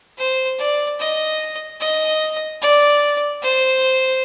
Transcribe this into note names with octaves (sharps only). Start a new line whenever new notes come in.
C5
D5
D#5
D#5
D5
C5